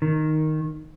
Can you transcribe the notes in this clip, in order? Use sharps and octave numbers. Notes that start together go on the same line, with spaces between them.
D#3